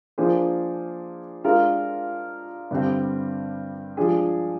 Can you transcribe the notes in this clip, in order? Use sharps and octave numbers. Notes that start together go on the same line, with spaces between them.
F3 A#3 D4 G#4 C5
G#3 D4 F4 A#4 F5
G2 D3 G3 C4
F3 G#3 D4 G#4